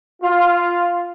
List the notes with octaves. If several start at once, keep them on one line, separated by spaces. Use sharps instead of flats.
F4